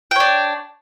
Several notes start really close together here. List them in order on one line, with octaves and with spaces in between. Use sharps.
G5 C#5 D4